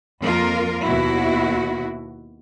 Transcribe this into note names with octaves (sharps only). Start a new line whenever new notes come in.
F2 A#3 F4 A#4
D#2 B2 E4 F#4